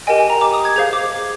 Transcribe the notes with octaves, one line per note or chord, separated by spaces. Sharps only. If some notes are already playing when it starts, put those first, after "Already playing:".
G4 A#4 D#5 G5 G#5
G#5
A#5
D6
D#6
G#6
G#4 C5 F5 G#6
D6